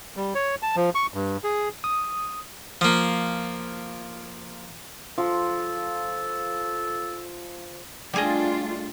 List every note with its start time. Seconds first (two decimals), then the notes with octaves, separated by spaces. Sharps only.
0.17 G3
0.35 C#5
0.63 A5
0.76 F3
0.95 C#6
1.14 G2
1.44 G#4
1.84 D#6
2.81 F3 A#3
5.18 F3 A4
8.14 G3 A3 D4 F4 G#4 D#5